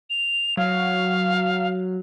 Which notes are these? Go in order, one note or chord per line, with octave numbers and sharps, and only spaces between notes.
F7
F#3 F5